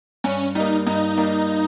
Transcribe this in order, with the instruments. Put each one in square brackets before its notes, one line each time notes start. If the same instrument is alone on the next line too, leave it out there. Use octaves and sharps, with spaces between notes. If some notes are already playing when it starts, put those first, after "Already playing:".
[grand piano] G2 [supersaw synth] C#4
[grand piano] G3 A#3 [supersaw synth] D#4
[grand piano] G2 [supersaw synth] D#4
[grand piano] G3 A#3